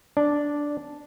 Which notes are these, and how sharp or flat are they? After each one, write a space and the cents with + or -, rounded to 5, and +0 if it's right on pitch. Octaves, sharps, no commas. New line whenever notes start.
D4 -5 D5 +0